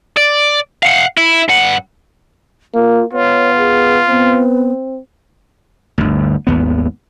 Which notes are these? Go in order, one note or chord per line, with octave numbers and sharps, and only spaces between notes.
D5
F5 F#5
E4
G2 F#5
A#3 F4
B3 F4 C#5
G#4
B3 C4
G1 D2
G#1 D#2 B3